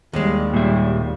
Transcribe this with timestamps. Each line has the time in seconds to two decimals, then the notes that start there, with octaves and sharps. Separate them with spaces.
0.13 D#2 G3 G#3
0.54 A#2 E5